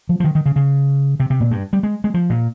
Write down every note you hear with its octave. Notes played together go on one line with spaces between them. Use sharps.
F3
F3
D#3
D#3
C#3
C#3
C3
C3
A#2
G2
G3
G#3
G#3
F3
A#2